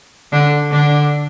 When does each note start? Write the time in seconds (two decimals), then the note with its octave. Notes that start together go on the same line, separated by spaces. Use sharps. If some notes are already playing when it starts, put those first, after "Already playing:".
0.33 D3 D4
0.71 D3 D4